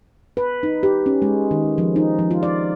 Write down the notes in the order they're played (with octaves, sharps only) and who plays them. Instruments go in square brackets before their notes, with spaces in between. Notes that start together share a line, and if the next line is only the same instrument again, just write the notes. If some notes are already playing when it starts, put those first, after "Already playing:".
[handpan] B4
D#4
G4
C#4
G#3
D#3
F3
D#4
F3
F4
D5